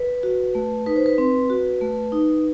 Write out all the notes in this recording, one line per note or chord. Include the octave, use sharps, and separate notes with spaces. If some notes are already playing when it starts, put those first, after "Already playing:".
Already playing: B4
F#4
A3
D#4 B4
C5
B4
C4
F#4
A3
D#4